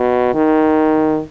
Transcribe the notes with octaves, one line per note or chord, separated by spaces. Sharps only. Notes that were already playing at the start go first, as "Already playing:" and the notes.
Already playing: B2
D#3